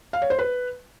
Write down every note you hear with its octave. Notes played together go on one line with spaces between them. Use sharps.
F5
C#5
C5
B4